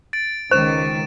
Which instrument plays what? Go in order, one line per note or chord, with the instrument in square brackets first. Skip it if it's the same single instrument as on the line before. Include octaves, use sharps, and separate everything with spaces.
[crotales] A6 D7
[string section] C#2 D#3 [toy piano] C5 [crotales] C#6 E7